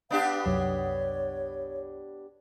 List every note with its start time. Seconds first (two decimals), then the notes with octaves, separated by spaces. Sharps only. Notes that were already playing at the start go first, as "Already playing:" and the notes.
0.11 B3 D4 G4 F5
0.46 C2 F#2 F#3 C#5